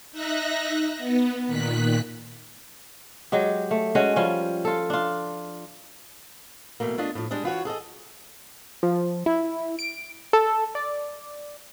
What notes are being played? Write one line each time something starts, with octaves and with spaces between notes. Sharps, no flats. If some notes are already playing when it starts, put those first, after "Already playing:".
D#4 E5 F#6 A#6
B3
A#2 D#3 F#6 B6
F#3 G#3 G4
A3
G#3 C#4 F#4
F3 G3 C#4
F4 A4
D4 F4
B2 E3 A3 A#3
A3 D4 F4 D#5
A2 F3
G3 G#3 D4 D#5
E3 F4 F#4 C#5
G#4 A4 D5 D#5
F3
E4
D7
A4
D5